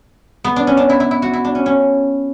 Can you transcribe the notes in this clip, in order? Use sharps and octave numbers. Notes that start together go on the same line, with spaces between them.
B3
D4
C#4
D4
E4
E4
E4
F#4
E4
D4
C#4
C#4